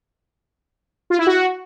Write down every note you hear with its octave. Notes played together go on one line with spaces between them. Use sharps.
F4
E4
F#4